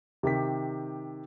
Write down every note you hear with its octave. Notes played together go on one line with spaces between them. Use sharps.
C3 D#3 G4 B6